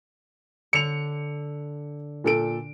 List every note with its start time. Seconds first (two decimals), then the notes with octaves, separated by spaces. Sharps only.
0.73 D3 C#7 F7
2.24 A#2 A4 D7